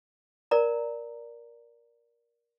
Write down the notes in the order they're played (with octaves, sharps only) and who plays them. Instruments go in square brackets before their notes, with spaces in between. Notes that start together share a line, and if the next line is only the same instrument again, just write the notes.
[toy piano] A#4 D5 A#5